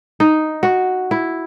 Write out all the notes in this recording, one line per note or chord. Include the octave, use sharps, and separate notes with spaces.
D#4
F#4
E4